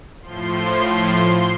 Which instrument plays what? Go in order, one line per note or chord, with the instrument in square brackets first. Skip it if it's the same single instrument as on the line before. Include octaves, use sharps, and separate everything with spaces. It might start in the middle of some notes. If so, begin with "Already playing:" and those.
[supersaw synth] A2 F3 C6